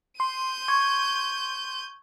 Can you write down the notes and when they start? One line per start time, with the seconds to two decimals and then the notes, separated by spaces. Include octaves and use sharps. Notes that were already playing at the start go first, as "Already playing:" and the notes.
0.20 C6 G6 D#7
0.68 C#6 G#6